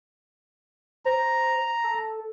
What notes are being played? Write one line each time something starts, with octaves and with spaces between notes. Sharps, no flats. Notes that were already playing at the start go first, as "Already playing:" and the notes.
C5 A#5
A4